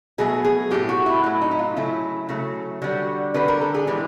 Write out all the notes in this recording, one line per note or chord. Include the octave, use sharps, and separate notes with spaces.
B2 F#3 A3 G#4
G#4
A2 F#3 A3 G4
F#4
E4
A2 F#3 A3 E4
D#4
E4
F4
C#3 F#3 A3 E4
C#3 F#3 A3
D3 G3 F#4
D3 G3 B4
A#4
A4
G#4
A2 E3 G#3 G4